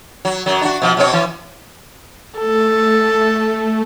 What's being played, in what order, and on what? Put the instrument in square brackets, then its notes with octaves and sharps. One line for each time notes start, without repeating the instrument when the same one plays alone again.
[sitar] F#3
F#2 F#3
D4 F#4
B2 F3
B2 C4 C#5
E3
[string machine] A3 [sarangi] A4